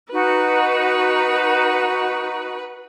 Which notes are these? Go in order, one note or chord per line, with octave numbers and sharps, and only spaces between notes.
D#4 F#4 B4